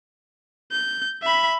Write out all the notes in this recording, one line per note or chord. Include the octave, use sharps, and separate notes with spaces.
G6
E5 B5